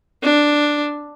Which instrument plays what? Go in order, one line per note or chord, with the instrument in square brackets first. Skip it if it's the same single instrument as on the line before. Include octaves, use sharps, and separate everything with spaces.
[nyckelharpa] D4